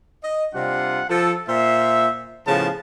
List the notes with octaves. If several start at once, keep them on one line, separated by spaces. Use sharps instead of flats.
D#5
C3 G3 D4 F4 F#5
F3 A4
A#2 C5 E5
A2 C#3 F3 B3 A5